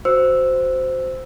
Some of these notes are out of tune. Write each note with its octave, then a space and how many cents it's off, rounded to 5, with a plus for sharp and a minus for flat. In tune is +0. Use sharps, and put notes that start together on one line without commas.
F#4 +0 C5 -10 E6 +0